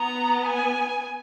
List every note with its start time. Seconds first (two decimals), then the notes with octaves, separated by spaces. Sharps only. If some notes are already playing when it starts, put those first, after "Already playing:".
Already playing: B3 A#5
0.46 G#5